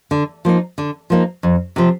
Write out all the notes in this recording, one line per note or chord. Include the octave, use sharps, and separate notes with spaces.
D3
F3 A#3 D#4
D3
F3 A#3 D#4
F2
C3 F3